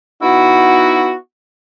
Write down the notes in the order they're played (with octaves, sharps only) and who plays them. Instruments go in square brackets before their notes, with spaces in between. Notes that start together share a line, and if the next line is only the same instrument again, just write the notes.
[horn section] B3 D#4 E4 F#4